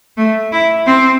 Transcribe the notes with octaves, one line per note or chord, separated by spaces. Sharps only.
A3
E4
C4